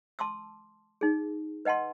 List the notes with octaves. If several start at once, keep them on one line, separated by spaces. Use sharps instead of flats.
A5 C6 D6 E6
D#4 G#4
B4 D#5 F#5 A5 C6